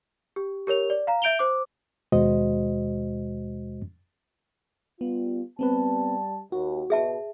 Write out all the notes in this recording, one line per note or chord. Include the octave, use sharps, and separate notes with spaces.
G4
G4 A#4 C#5 F7
D5
F5 A#5
E5 G6 D7 F7 G7
C5 D6
D#2 B2 G#3 F#4 C5 D#5
G3 B3 F4
G3 B3 C4 B4 A5
D#2 F#4
B2 G#4 E5 A5